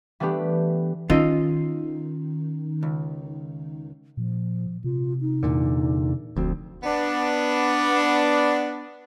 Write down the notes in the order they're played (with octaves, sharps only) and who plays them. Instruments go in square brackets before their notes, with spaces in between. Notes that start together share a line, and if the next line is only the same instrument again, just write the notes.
[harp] E3 G3 A3 B3 D4 G4
[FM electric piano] D#3 D#4 [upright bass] C#4 [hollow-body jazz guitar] F4 D#5
[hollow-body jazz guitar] C#2
[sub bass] A#2 [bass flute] F3
[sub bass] C3 [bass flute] F4
[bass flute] D#4
[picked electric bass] E2 A#2 D3
[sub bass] E1 [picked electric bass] D2 F3 C4 [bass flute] F#4
[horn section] B3 D4